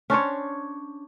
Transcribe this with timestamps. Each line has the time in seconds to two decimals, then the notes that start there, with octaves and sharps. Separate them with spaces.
0.10 C#4 D4 C5 C#5